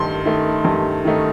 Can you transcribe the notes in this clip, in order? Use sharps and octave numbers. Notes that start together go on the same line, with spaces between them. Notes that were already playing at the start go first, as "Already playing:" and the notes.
Already playing: G2 D#3 A3 D#4 C6
D#3 A3 D#4
G2
D#3 A3 D#4